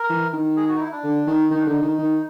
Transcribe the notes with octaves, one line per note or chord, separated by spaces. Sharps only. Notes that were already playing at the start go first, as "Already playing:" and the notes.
Already playing: A#4
E3
D#3
G#4
F#4
D#4
E4
D4
D3
D#3
D#3 D#4
D4
D3 D#4
D#3
D#3